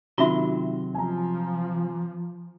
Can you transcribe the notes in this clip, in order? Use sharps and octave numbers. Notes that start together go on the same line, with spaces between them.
C3 D#3 F#3 F4 F#4 E5 C6
F3 G#5 A#5